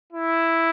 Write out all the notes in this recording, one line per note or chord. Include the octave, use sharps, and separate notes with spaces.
E4